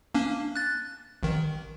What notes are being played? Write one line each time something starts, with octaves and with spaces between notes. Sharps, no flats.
A#3 C#4 D4
F#6 A6
A1 D#3